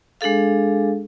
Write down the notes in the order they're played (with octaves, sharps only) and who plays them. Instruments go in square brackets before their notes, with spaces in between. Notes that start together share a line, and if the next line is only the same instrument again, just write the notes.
[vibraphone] G#3 D4 G#4 A4 F5